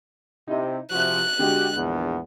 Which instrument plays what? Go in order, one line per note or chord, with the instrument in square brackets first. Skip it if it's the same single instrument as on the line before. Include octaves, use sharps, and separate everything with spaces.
[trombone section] C3 [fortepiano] D#4 E4 D#5
[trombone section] C3 F3 [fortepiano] F#4 E5 [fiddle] F#6
[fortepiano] D3 G#3 [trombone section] F#4 G4
[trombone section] A#1 E2 B3